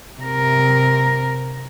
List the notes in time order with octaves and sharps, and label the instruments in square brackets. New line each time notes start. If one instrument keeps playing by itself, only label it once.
[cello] C3 A#4